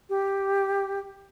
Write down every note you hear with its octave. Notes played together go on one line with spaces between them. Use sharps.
G4